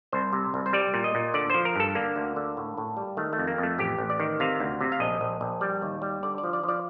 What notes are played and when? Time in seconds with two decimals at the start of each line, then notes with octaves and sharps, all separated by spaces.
0.12 C2 C5
0.33 C3
0.54 C2
0.66 C5
0.73 G3 D5
0.94 A#2
1.04 D#5
1.15 A#2
1.34 D3 D5
1.50 F3 C5
1.65 A#4
1.76 G2 A4
1.95 D3 A#3
2.16 D2
2.36 D3
2.57 A2
2.78 A2
2.97 G3
3.17 D#3 A3
3.33 A3
3.38 F2
3.47 A#3
3.58 F2
3.63 A3
3.79 A1 G4
3.98 A1
4.10 D5
4.20 D#3
4.40 C3 F5
4.60 D2
4.81 C3
4.92 F5
5.00 A#1 D#5
5.21 A#1
5.41 A#1
5.61 G3 D5
5.82 D#2
6.02 G3
6.23 D3 D5
6.38 D5
6.43 F3
6.53 D5
6.63 F3 D5